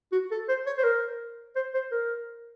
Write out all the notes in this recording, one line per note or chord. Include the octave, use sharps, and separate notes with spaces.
F#4
A4
C5
C#5
C5
A#4
C5
C5
A#4